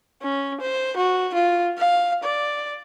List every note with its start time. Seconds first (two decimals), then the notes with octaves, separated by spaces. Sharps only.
0.22 C#4
0.61 C5
0.97 F#4
1.35 F4
1.78 F5
2.24 D5